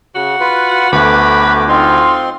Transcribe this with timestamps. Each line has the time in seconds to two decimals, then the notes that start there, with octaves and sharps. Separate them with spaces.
0.15 C#3 F#4
0.40 F4 B4
0.92 D2 A3 B3 B4 D6
1.69 C4 D#4 F4 C6